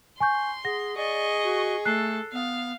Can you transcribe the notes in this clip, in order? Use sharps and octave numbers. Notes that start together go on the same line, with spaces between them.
G#5 C6 C#6 G6
G#4 F#5 A#6
G#4 D5 D#5 C#6
F#4
A3 A4 F#6 C7
B3 F5